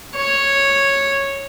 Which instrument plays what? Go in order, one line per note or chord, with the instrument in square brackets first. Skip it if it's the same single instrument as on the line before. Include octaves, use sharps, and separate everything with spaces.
[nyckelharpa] C#5